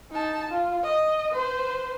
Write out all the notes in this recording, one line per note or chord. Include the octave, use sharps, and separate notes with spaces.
D#4 A5
F4
D#5
B4 C5